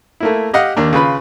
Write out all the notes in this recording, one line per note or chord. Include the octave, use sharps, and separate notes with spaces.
A3 A#3 E4
G4 D#5 F5 F#5
D#2 A#3 D4
C#3 F4 B4 B5